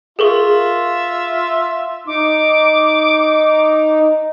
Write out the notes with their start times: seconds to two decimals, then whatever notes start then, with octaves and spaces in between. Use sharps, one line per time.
0.19 F4 G#4 A#4 E5 C#6
2.07 D#4 D6